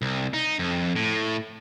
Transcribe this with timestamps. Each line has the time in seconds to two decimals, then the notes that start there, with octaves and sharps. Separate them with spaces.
0.02 C2
0.34 D#4
0.59 F2
0.96 A2